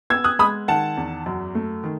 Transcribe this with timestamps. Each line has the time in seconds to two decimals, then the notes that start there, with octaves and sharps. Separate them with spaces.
0.10 B3 E6 G#6
0.24 D#6 F#6
0.39 G#3 B5 D#6
0.68 D#3 F#5 A5
0.97 E2
1.26 F#2
1.55 A3
1.84 D#3